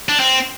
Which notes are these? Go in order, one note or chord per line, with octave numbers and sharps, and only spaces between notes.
D4
C4